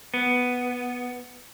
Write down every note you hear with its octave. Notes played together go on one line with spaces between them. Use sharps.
B3